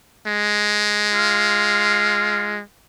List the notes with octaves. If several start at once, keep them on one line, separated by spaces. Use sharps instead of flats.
G#3
F4